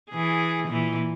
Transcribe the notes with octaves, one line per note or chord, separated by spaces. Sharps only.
E3 G#4
A#2 E3